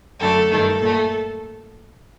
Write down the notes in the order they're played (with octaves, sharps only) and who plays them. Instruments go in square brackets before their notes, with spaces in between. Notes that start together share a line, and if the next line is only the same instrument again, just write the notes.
[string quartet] F#2 D3 A3 A4
G2 D#3 A3 A4
A#2 A3